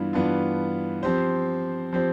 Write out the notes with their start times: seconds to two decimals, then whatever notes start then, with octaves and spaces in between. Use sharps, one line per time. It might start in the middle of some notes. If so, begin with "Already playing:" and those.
Already playing: G2 E3 B3 D4 F4
0.13 G2 E3 B3 D4 F4
1.03 F3 C4 G4 C5
1.93 F3 C4 G4 C5